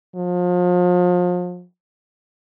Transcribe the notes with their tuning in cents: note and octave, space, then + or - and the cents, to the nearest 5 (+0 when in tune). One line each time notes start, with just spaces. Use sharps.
F3 +35